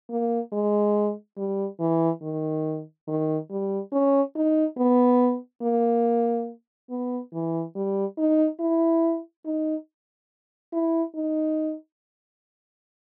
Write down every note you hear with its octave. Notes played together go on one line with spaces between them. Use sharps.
A#3
G#3
G3
E3
D#3
D#3
G3
C#4
D#4
B3
A#3
B3
E3
G3
D#4
E4
D#4
E4
D#4